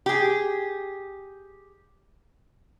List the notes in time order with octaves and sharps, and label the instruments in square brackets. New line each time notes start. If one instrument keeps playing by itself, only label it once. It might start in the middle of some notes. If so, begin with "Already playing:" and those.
[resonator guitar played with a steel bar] G4 G#4